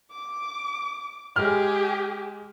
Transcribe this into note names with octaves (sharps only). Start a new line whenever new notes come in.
D6
G#3 G4 G#4 F6